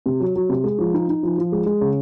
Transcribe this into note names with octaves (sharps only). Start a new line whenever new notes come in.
C3
F#3
F#3
C3
G#3
F3
D#4
D#4
F3
F3
G#3
G#3
C#3